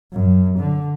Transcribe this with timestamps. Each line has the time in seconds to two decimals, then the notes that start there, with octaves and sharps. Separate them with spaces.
0.13 F#2
0.59 D3